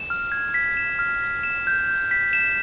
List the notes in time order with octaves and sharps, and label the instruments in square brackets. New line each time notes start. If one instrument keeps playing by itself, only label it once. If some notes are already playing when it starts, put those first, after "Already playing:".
Already playing: [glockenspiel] E7
F6
G#6
B6
E7
F6
B6
E7
G6
G6
B6
E7